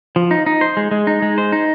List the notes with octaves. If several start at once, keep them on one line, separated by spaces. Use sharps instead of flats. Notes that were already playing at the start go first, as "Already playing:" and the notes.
F3
D#4
D#4
C5
G#3
G#3
D#4
G#3
C5
D#4